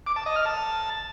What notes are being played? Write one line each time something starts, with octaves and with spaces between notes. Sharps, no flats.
D6
A5
D#5
F6
A5